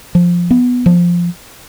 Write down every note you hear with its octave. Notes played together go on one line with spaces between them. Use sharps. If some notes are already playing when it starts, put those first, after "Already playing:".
F3
B3
F3